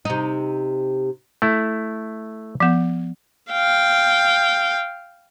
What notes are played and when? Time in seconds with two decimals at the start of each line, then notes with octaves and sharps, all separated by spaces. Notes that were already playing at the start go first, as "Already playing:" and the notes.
0.05 C3 D#4
1.42 A3 E4
2.60 F3 B3
3.52 F5 G5